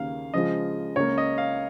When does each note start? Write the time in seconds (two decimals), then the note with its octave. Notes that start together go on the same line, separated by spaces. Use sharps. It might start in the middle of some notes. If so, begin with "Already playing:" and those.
Already playing: D#2 C#3 A#3 F5
0.34 C#3 F3 G#3 F4 D#5
0.96 C#2 C#3 A#3 C#5
1.18 D#5
1.38 F5